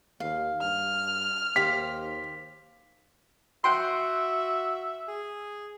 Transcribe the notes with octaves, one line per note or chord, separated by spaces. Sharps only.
D#2 F5
G2 F6
D#2 G4 C5 F5 B6
F#4 E5 F#5 G5 C6
G#4